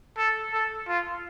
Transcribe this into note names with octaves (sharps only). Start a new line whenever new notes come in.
A4
A4
F4